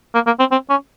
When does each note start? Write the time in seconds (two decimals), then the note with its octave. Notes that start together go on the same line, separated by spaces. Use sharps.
0.14 A#3
0.26 A#3
0.40 C4
0.51 C4
0.70 C#4